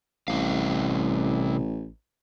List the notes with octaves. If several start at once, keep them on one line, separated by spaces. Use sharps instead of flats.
A1 C3 G3 F5